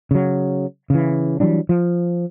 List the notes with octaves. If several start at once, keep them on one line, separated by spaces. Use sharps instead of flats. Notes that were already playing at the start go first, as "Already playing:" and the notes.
C#3 F#3
C#3 E3
E3 F#3 G3 D4
F3